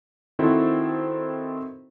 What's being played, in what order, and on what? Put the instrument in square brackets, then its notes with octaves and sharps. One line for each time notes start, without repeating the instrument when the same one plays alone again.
[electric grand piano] D#3 C4 E4 F#4 A4 C5